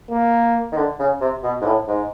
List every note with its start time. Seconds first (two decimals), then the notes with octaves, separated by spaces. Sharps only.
0.11 A#3
0.72 D#3
0.76 D3
0.99 C#3
1.21 C3
1.43 B2
1.61 G#2
1.66 A2
1.88 G#2